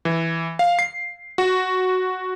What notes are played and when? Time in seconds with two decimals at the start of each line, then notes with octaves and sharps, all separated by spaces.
0.05 E3
0.59 F5
0.79 C7
1.38 F#4